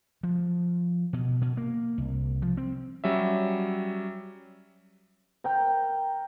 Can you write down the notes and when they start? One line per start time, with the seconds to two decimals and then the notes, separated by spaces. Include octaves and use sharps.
0.23 F3
1.13 B2
1.41 B2
1.57 A#3
1.98 C2
2.42 F3
2.57 C4
3.04 F#3 G3 C#4 E5
5.44 A#4 G5 A#5